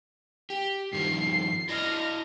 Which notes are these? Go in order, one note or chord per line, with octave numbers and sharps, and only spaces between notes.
G4
G2 D#3 F3 C7
E4 D5 D#5 F6 A#6